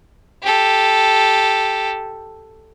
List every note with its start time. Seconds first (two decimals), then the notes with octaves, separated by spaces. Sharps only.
0.43 G4 A4